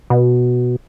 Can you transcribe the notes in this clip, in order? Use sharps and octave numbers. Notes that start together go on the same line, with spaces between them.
B2